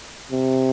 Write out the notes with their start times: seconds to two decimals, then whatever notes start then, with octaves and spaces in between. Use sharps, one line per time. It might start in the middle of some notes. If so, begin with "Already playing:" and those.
0.32 C3